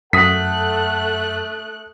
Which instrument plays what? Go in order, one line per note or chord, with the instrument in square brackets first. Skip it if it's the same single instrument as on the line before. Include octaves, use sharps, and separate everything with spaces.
[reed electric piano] F#2 [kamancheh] A3 F#6 [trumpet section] A4 F#5 [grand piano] D#6 B6